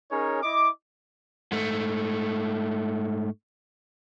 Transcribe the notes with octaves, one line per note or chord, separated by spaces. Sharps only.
C#4 D#4 G#4 A#4 C#5
E4 D#5 D6
G#2 A3